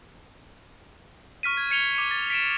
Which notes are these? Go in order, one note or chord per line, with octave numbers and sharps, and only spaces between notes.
C#6 F6 B6 D#7
G#6
G#6 C#7 D#7 F7 G7
D6 C#7
A6
B6 D7 E7